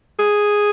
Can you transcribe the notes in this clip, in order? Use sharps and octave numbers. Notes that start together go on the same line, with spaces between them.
G#4